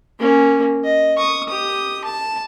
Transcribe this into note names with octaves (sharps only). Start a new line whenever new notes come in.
A#3 C#4
D#5
C#6 D#6
G4 D#6
A5